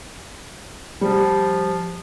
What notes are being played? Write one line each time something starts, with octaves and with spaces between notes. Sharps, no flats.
F3 G3